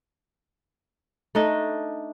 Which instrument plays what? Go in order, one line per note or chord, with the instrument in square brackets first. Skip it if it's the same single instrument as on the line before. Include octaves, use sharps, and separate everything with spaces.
[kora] A3 D4 D#4 D#5